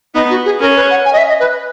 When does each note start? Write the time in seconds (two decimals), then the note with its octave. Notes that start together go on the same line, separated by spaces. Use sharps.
0.14 B3 D#4
0.30 F#4
0.44 G#4
0.60 C#4 A#4
0.75 B4
0.90 F#5
1.05 G#5
1.13 D#5
1.17 E5
1.28 D#5
1.39 B4